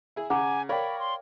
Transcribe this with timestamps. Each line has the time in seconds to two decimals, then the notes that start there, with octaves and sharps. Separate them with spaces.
0.16 E4 G#4
0.30 C#3 F#5 G#5 A#5 D6
0.69 A#4 C#5 D5 F5 G5 B5
0.99 C6